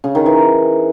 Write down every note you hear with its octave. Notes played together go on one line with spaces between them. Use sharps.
C#3
D#3
E3